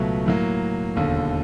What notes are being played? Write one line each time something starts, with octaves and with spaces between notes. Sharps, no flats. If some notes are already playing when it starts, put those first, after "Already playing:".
Already playing: C#2 B2 F#3 A3
A2 F#3 A#3
E1 D#2 D3